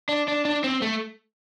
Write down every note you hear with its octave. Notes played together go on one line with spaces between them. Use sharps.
D4
D4
D4
C4
A3